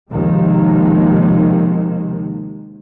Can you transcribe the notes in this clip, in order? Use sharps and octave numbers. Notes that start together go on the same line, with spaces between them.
D#2 C3 D#3 F3 G#3